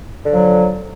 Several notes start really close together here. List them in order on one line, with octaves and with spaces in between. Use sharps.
D3 F#3 F3